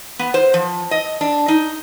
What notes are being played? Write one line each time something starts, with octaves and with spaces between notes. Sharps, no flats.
B3
C5
F3
D#5
D4
D#4